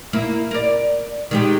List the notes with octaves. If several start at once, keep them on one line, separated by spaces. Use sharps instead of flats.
A#3 E4
A#4 D5
D#3 G#3 G4